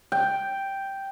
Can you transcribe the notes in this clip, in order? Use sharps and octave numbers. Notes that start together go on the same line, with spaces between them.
G5